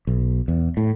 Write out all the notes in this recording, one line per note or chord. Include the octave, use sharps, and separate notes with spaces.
B1
E2
A2